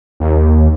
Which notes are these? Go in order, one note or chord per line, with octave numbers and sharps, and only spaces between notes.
D#2